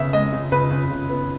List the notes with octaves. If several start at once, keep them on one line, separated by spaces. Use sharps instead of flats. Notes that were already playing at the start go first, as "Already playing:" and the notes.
Already playing: C#3 B3 E5
G#3 D#5
C#3
C#3 B4
C#3
C#3
B3